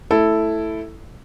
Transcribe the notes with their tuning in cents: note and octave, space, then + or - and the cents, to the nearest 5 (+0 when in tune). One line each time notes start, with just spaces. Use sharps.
A3 +0 E4 +0 A4 +0